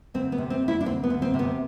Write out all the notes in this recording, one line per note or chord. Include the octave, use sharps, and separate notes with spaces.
D2 C4
B3
C3
C4
D2
E4
D4
D2 C4
B3
D2
C4
C3
B3